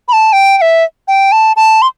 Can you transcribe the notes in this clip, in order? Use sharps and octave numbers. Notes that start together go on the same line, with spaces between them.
B5
A5
G5
G5
E5
G5
A5
A5
C6